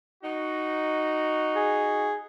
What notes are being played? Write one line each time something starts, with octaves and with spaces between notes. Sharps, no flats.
D#4 F#4
G#4